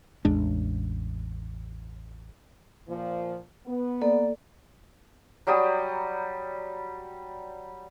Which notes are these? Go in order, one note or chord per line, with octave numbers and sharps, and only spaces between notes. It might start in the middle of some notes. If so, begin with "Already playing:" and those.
A1 E2 G#3 D4
A#2 F3
B3
A#3 A4 D5
F#3 G3 G4 D#6